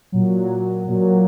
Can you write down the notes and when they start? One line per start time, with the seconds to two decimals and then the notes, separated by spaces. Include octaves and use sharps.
0.12 A#2 F#3
0.88 A#2 F#3